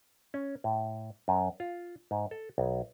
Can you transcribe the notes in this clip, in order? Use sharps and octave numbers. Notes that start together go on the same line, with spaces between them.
C#4
A2
F#2
F4
G#2
A4
B1